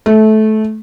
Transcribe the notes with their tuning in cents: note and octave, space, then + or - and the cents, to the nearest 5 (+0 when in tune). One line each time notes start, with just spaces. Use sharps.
A3 -20